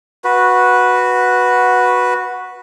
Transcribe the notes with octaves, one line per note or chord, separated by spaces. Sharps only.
F#4 B4